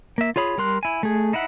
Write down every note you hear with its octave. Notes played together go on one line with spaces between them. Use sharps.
A#3 E5
F4 G#4 C#5 B5 D#6
G3 A#4 C6 F#6
E4 G#5
A3 G#4
D#4 E4 E5 F#5